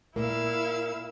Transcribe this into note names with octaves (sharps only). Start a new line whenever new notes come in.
A#2 A#3 E4 F5 E6